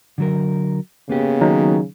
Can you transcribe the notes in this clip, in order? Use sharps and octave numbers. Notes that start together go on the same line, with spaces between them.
D3 F#3 A#4
C#3 A#3 B3 G4
D#3 F#3 D#4